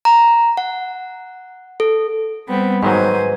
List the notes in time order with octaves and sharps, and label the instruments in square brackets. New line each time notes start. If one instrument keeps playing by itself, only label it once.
[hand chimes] A#5
F#5
A4
[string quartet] G3 B3 C4
[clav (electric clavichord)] G#2 D#3 F#3 [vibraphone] B4 [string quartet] C5 G#5